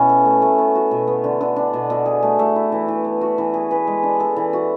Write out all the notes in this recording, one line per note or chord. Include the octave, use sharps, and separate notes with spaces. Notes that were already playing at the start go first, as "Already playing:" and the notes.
Already playing: B2 C#4 E4
A4
A3
A3
B3
F#4
B2
B3
D3
D3
D4
B2
B2
G#4
A3
A3
E4
E3
E3
B3
F#4
E3
G#4
B4
G#3
D4
A4
E3
F#4